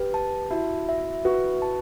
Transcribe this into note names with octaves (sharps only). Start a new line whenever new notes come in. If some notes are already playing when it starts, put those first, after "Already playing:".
Already playing: G4 B4
A5
E4 F#4
E5
F#4 B4
A5